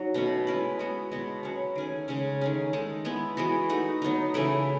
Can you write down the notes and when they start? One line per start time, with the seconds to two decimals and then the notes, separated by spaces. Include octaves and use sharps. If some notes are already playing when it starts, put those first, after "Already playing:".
Already playing: F#3 D#4 F#4
0.14 B2 A3 C#4
0.47 G#3 C#4 E4 B4
0.79 G#3 B3 F#4
1.12 B2 G#3 B3 F#4
1.43 F#3 C#4 F#4
1.75 D#3 A3 C#4 G#4
2.08 C#3 G#3 C#4
2.41 D#3 A3 C#4 G#4
2.73 G#3 D#4 A4
3.05 G#3 B3 E4 G#4
3.37 E3 G#3 B3 F#4
3.69 A3 D#4 F#4
4.02 F#3 B3 D#4
4.34 C#3 E3 A3 E4